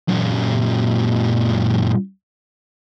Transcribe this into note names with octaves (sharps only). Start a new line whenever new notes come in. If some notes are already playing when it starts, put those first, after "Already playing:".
F#2 A#2